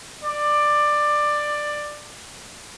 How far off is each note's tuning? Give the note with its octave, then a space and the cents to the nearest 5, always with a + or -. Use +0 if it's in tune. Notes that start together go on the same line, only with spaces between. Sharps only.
D5 +15